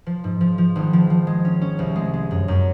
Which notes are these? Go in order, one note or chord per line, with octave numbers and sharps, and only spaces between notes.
F3
G#2
F3
F3
G#1
F3
F3
G#3
C#4
C#4
C2
G#3
G#3
F#2
F#2